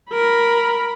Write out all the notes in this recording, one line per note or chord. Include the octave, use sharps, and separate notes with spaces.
A#4 B5